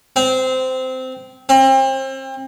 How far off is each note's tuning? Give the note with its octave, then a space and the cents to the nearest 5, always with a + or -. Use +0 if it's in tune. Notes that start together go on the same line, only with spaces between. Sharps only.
C4 -15
C4 +35